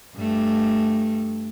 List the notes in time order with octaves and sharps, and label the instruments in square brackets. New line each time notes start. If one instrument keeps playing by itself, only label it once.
[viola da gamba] G2 A3